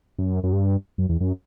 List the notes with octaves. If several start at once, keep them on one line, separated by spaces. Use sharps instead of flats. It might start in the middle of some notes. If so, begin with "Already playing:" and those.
F#2
F#2
G2
F#2
E2
F#2